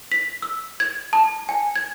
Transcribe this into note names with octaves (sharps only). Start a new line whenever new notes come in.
B6
E6
G#6
A5
G#5
G#6